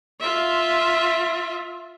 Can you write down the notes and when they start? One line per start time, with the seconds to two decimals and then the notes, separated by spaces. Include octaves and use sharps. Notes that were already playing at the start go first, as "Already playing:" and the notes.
0.20 F4 E5